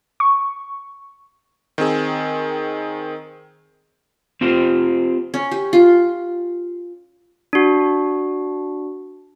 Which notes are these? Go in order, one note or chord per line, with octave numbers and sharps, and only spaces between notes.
C#6
D#3 C4 G#4
C4 F4 G4 C5
C#4
G4
F4
D4 F#4